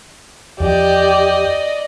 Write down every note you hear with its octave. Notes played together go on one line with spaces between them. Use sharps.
E2 F3 G4 D5 D#5